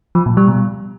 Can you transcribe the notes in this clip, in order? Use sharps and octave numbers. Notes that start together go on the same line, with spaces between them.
F3
A#2
G3
B2